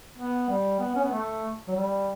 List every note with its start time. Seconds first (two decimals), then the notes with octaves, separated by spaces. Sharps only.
0.18 B3
0.49 G3
0.80 B3
0.96 C#4
1.04 B3
1.11 A3
1.68 F#3
1.76 G3